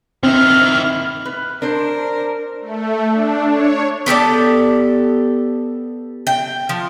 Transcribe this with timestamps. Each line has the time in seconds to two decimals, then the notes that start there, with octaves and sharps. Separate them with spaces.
0.23 D#3 C4 E4 F6
1.25 B4
1.62 D4 A#4 C5
2.61 A3
3.12 D4
3.46 C#5
4.06 B3 G4 A4 D5
6.27 G5
6.69 F3